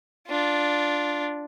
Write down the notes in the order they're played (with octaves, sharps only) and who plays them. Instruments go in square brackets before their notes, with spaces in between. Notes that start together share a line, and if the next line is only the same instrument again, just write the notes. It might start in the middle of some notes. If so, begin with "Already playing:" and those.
[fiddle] D4 F4